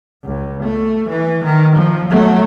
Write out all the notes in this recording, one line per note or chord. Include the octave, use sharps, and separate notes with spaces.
C#2
A3
E3
D#3
F3
F#3 A3